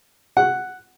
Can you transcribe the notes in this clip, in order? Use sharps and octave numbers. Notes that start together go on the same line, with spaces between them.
F#5